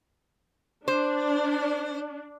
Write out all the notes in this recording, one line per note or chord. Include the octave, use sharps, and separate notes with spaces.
D4 C5